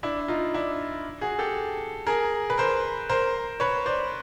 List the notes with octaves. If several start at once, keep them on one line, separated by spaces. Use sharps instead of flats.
D4 E4
D#4 F4
D4 E4
F#4 G#4
G4 A4
G#4 A#4
B4
A#4 C5
A#4 C5
B4 C#5
C5 D5